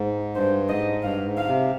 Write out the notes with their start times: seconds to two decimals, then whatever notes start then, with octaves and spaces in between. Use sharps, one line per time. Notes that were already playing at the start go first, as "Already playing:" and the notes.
Already playing: G#2
0.35 G2 C5
0.69 G#2 D#5
1.03 G2 F5
1.25 G#2
1.37 F5
1.48 C3